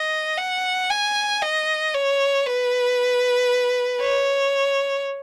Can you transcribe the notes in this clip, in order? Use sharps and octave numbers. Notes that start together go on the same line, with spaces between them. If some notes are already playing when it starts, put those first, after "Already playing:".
Already playing: D#5
F#5
G#5
D#5
C#5
B4
C#5